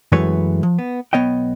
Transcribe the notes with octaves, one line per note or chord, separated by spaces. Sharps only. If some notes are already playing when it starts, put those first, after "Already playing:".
F#2 E3 G#3 A3 B4 C#5
F3
B3
B1 F#3 B3 C#5 D#5 G5